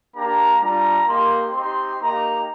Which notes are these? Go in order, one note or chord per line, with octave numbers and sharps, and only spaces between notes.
A#3 D4 G4 A#5
G3 D4 F4 A#5
A#3 D#4 G4 C6
C4 D#4 G4 C6
A#3 D#4 G4 A#5